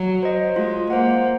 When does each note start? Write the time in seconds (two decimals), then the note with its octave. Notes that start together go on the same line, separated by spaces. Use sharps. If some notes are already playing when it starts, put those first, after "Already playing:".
Already playing: F#3
0.23 C5 D#5
0.56 G#3 F4
0.90 A#3 C5 F#5